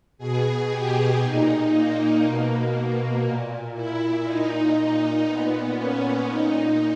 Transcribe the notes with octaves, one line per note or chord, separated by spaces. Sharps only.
B2 G#4
G4
A#2 D#4
A#3
B2
A#2
E4
A#2 D#4
A#2 B3
C#4
A#2 D#4